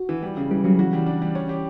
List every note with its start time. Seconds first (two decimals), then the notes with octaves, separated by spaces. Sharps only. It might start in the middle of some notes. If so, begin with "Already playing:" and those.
Already playing: F#4
0.09 E3
0.23 G3
0.37 C#3
0.51 E3 G3
0.64 C#3 F#3
0.79 E3 F#4
0.93 G3
1.06 D4
1.22 G3
1.35 C#4
1.49 G4